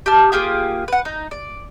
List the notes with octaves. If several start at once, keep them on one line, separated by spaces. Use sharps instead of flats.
G4 A5 F6
A#3 F4 G4 G#4
B4 F#5
D#4
D5